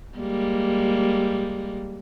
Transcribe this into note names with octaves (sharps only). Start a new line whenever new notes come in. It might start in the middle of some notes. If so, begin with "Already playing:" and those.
G3 G#3 A#3